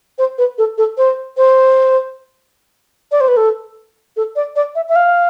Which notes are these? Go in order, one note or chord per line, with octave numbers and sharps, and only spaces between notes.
C5
B4
A4
A4
C5
C5
D5
C5
B4
A4
A4
D5
D5
E5
E5
F5